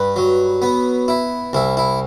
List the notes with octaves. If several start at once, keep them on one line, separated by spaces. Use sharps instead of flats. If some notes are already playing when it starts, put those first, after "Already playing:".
Already playing: G2 B4
F#3
B3
E4
C2 E4
E4